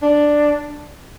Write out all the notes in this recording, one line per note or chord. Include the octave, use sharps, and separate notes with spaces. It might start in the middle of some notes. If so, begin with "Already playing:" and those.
D4